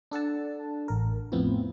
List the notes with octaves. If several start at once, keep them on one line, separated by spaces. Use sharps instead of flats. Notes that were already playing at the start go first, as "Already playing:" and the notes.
D4 A4 F#5 A5
A1 A#4
F2 A2 B3 C4 E4 F4